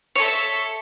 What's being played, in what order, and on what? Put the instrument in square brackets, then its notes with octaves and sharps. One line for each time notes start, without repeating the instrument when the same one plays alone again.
[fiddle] A4 E5 [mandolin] C#5